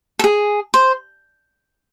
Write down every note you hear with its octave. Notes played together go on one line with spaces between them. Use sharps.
A4
G#4
C5